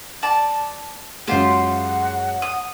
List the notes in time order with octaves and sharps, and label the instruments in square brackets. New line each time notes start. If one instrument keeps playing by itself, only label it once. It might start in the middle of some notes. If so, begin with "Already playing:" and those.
[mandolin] D5 A5
[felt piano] F#2 G#3 [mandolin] F4 G4 C5 [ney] F#5
[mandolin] D#6